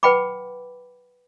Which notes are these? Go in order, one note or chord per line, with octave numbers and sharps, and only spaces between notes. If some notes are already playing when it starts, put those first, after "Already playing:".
B4 F#5 G5 B5 D6